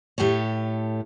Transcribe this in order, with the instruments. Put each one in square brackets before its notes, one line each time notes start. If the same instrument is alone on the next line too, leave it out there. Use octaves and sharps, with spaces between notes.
[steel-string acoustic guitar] A2 G4 A4 C#5